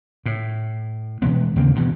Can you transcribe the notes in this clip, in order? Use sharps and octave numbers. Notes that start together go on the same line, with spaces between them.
A2
B2 E3 G#3 B3
D#2 C#3 A#3 C4
G2 B2 E3